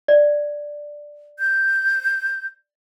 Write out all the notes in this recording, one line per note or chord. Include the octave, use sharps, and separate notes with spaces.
D5
G6